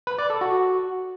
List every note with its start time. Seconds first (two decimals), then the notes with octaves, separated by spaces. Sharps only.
0.07 B4
0.18 D5
0.30 A4
0.41 F#4